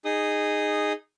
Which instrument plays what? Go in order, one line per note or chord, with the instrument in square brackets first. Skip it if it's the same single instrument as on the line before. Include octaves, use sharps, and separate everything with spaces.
[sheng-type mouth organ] D#4 G#4 D#6